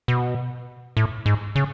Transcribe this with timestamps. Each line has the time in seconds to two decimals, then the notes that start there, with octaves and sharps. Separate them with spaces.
0.08 B2
0.97 A2
1.26 G#2
1.56 C#3